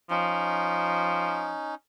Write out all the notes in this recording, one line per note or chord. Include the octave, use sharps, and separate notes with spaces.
F3 C#4 D#4